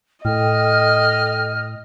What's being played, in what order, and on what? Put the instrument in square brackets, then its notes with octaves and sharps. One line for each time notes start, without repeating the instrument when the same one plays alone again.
[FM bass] A2 [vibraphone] A4 G5 [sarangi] D#5 [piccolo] F6